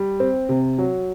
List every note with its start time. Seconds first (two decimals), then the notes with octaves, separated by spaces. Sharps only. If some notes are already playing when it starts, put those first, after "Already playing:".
Already playing: G3
0.20 C4
0.49 C3
0.78 F#3